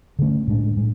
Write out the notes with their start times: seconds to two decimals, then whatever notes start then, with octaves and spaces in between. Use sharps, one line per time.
0.19 D3 A3 C#4
0.47 A2 G#3 D4
0.77 A2 G#3